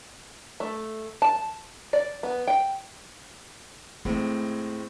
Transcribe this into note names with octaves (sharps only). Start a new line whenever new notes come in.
A3
A5
D5
B3
G5
A2 G#3 A3 C4